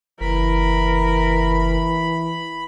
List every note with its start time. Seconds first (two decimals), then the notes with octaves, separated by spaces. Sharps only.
0.21 F#1 E3 A#4 B5